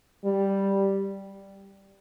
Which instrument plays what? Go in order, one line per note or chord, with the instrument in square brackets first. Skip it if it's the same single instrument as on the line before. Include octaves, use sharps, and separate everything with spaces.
[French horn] G3